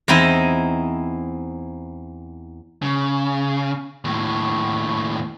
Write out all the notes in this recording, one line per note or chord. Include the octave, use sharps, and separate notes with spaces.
E2 C4 D#4 E4 D#5
C#3
D#2 A2